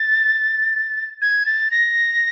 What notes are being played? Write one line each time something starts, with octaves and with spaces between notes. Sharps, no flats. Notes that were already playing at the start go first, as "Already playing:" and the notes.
Already playing: A6
G#6
A6
A#6